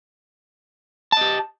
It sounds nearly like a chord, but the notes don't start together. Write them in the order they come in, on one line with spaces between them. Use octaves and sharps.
A5 D#5 G4